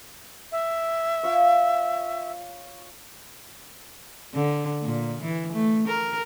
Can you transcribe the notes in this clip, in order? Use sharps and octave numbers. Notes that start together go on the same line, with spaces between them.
E5
F4 C#5
D3
A#2
E3
A3
A#4